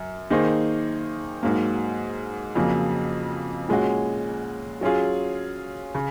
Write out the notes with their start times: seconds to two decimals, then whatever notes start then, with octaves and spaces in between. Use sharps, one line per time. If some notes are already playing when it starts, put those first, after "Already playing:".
Already playing: F#2
0.30 D#3 A#3 D#4 G#4 C5
1.43 G#2 F#3 A#3
2.55 F2 C#3 F#3 A#3
3.69 A#2 G#3 C#4 F#4
4.81 F#3 C#4 F4 G#4
5.95 C#3